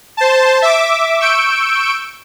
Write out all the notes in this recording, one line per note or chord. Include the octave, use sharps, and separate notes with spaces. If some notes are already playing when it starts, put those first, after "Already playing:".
C5 A5
E5 D6
C#6 E6 G6 D7